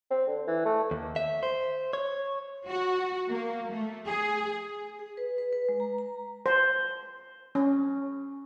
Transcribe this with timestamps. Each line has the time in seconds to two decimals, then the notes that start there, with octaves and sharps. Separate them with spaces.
0.10 C4
0.27 D3
0.47 E3
0.65 A3
0.91 D#2
1.16 E5
1.43 C5
1.93 C#5
2.69 F#4
3.29 A#3
3.71 A3
4.07 G#4
4.99 G#4
5.17 B4
5.38 B4
5.53 B4
5.69 G#3
5.80 A#5
5.98 A#5
6.46 C5
7.55 C#4